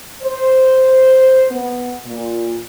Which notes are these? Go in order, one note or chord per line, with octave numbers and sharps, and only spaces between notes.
C5
B3
A#2